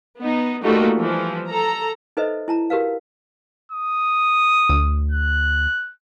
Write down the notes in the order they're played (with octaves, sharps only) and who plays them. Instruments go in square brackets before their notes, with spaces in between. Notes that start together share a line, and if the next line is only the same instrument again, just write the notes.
[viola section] B3 D#4
G3 A3 A#3 D#4 F4 F#4
E3 F3
A4 A#5
[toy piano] D#4 A4 B4 C5 D#5 E5
E4 A5 A#5
F#4 G4 A#4 B4 F5
[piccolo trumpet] D#6
[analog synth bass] D2
[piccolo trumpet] F#6